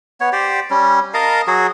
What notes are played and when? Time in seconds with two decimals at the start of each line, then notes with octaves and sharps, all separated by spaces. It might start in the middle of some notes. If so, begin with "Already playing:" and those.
0.20 B3 C#5
0.33 G4 C5 D5
0.70 G3 C#4
1.14 A#4 D#5 F5 A5
1.47 F#3 F#4 G#4